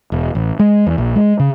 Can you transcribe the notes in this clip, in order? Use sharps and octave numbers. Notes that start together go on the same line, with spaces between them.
E1
A1
G#3
E2
A#1
G#3
C#3